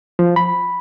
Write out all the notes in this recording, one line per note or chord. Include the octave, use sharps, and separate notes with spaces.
F3
B5